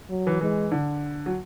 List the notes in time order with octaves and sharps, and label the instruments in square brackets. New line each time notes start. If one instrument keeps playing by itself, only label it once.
[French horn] F#3
[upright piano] E3
[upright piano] E3 [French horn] G#3
[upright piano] D3
F#3